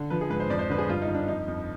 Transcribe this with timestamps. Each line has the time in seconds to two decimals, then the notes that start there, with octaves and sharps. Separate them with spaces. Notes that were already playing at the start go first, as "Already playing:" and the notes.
Already playing: D3
0.10 F3 B4
0.21 G#4
0.30 G#2 B4
0.40 C5
0.50 F2 D5
0.59 C5
0.70 D3 B4
0.78 G#4
0.89 G2 F4
1.02 D#4
1.08 G2
1.14 D4
1.27 F2 D#4
1.48 F2